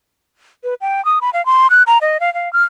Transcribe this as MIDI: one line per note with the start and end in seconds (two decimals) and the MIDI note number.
0.64 0.74 71
0.81 1.04 79
1.05 1.19 87
1.21 1.30 83
1.33 1.44 77
1.46 1.67 84
1.70 1.83 90
1.87 1.98 82
2.01 2.20 75
2.20 2.33 77
2.34 2.51 77
2.53 2.63 89